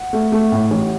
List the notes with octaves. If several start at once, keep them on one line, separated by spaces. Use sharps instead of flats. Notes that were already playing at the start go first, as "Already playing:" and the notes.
Already playing: F#5
A3
A3
A2
A1